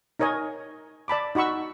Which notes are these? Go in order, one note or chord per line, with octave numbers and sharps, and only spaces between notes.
D#4 A#4 C#5 D#5 G#5
D5 A5 B5 D6
D#4 F#4 B5 C#6 E6